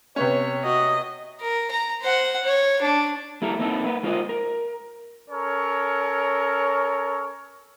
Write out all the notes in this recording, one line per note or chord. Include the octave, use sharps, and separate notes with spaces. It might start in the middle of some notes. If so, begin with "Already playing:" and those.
C3 B3 C#4 C#5
F#4 D#5
A#4
A#5
C5 F#5
C#5
D4
G3 A#3 E4 A4 A#4
A#3 C4 D#4 E4 G4 A4
A#3 B4
G#3 F4 A#4 C5 D#5
A#4
C#4 A4 A#4 C#5